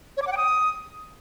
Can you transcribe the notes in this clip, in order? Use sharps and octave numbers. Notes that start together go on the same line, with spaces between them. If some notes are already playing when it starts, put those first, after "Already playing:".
C#5
D6
F#5
G5
D#6